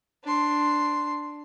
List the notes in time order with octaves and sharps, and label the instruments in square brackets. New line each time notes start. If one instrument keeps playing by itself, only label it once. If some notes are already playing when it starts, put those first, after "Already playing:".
[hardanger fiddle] D4 C6